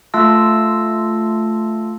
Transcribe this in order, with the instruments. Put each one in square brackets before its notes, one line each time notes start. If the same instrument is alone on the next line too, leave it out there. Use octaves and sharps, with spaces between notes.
[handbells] A3 F4 F5 A5 E6 A#6